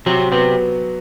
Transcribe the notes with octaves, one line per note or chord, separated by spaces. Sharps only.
C3 F#3 C4
C3 B3 C4